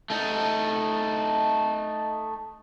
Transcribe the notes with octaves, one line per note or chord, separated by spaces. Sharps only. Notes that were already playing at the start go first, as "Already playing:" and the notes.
A3 D#4